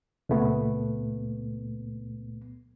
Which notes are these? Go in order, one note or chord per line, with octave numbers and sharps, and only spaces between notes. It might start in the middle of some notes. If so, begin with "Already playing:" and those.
C#2 A#2 A3 B3